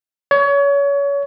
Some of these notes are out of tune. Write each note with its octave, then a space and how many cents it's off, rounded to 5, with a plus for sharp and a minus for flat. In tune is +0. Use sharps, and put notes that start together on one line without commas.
C#5 +30